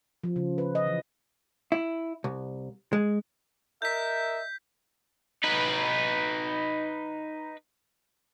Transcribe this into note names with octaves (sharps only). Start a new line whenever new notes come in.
F3
C#3
B4
D#5
E3
E4
C2
G#3
A#4 D#5 E5 G6 B6
D#4 B4